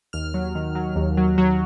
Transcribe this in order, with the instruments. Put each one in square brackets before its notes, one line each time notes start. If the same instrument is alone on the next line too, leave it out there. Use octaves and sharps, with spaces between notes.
[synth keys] D#2 F6
F#3
D#3
F#3
D#2
F#3
F#3